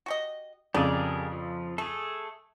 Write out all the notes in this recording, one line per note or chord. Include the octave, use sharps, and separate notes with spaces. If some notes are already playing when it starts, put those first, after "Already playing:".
F#4 G4 D#5
F2 C#3 G4 G#4 A#4 D5
F3
A3 G#4 A4